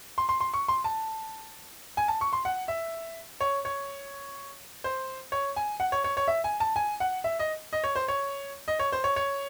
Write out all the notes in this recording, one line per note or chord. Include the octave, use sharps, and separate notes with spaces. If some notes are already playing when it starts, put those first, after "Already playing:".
C6
C6
C6
C#6
C6
A5
G#5
A5
C#6
C6
F#5
E5
C#5
C#5
C5
C#5
G#5
F#5
C#5
C#5
C#5
E5
G#5
A5
G#5
F#5
E5
D#5
D#5
C#5
C5
C#5
D#5
C#5
C5
C#5
C#5